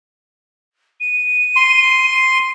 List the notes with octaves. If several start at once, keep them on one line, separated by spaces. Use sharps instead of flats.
D#7
C6